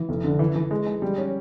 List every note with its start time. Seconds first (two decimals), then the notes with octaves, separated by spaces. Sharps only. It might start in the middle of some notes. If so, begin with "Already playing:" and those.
Already playing: E3
0.09 F1
0.24 D3
0.39 E3
0.55 E3
0.71 G#3
0.86 G#3
1.02 G3
1.18 C#4